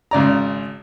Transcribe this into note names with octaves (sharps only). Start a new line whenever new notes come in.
G#1 C#3 D5 A#5